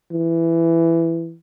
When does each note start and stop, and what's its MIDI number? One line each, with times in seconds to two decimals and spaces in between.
0.11 1.35 52